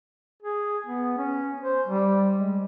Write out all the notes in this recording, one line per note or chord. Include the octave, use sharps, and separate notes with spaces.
G#4
B3
C#4
C5
G3
G#3